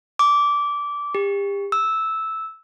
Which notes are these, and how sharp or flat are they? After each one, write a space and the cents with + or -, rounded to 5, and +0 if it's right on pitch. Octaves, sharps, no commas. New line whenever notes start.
D6 -15
G4 +35
E6 -10